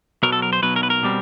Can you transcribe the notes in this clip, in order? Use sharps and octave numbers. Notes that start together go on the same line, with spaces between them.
B1 B2 F#3 A#4
A4
A#4
C5
B1 B2 F#3 B4
A#4
B4
A#4
B2 G3 C4